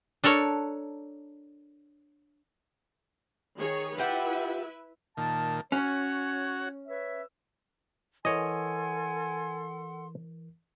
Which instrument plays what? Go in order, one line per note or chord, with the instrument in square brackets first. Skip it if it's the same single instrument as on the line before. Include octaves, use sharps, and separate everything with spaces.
[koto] D4 A4 A#4 C#5
[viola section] D#3 G#4 C#5
[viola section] E4 B4 E5 [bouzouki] F4 G4 F#5
[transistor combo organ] A#2 D#3 [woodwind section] A5
[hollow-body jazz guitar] C#4 [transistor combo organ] F#4 [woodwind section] C#5
[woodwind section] B4 C#5 E5
[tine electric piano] E3 A#4 [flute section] A4 F#5 C6 [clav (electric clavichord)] C#5 D#5 [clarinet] G#5